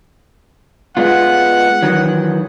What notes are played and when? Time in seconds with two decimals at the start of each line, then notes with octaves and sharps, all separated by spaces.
0.97 G#3 B3 F4 F#5
1.83 D#3 E3 F#3